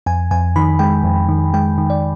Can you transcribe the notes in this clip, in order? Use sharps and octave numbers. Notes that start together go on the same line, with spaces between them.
F2 G#5
F2 G#5
D#3 B5
G#3 G5
F2
D#3
G#3 G5
D#3
D5